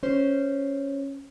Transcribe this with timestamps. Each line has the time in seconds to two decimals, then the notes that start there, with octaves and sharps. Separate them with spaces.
0.03 C#4 C5